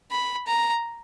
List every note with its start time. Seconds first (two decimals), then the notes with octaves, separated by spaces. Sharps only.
0.11 B5
0.47 A#5